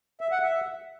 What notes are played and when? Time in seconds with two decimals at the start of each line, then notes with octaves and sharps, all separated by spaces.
0.21 E5
0.32 F#5
0.43 E5